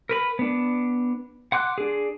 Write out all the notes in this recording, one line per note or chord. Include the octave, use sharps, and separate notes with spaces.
A#4 B4 B5
B3 D4
F#5 C6 D6 F#6
D4 G#4